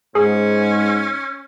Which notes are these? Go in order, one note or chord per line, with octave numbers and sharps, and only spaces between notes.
G#2 C#4 G#4